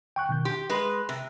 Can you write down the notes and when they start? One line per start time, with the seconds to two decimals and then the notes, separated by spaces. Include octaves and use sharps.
0.16 G5 C#6 F#6
0.29 B2 D#3 G6
0.45 G4 C6
0.70 G#3 B4
1.09 C3